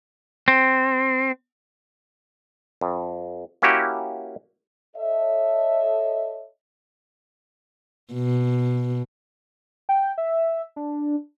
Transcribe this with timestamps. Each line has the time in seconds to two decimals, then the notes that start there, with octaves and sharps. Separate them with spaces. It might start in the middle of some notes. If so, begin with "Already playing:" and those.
0.48 C4
2.81 F2
3.62 A#3 C#4 E4 F#4 G4
4.96 A4 C#5 D#5 E5
8.13 B2
9.89 G5
10.18 E5
10.76 D4